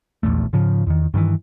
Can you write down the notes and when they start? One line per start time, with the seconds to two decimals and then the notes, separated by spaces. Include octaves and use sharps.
0.23 D#1 A#1 E2 A3
0.53 G#2 C#3 F3
0.87 E2 D#3
1.14 G2 D#3 E3